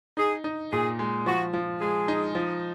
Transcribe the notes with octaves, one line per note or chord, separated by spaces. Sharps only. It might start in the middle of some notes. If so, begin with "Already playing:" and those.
D#4 G#4
D#4
A#2 G#4
G#3
F3 F#4
F3
G#3 G#4
D#4
F3